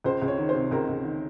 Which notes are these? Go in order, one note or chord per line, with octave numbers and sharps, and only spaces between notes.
C#2 C5
C#2
C#5
D#3
C5
C3
C#2 A#4
C#2
D#3